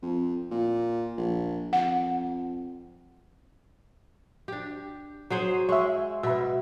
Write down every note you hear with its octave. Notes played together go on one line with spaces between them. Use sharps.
F2
A#2
A#1
F2 F#5
D4 G4
F#3 G#4 C5
G#3 C#5 E5
B2 B4 E5